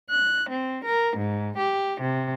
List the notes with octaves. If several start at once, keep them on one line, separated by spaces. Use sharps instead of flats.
F#6
C4
A#4
G#2
G4
C3